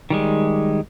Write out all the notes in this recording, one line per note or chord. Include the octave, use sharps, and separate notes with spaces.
D#3 G3 G#3